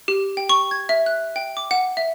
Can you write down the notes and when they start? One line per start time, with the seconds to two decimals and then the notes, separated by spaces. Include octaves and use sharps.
0.08 G4
0.37 G5
0.49 C#6
0.71 G#6
0.89 E5
1.06 F#6
1.36 G5
1.57 D6
1.71 F#5
1.97 E5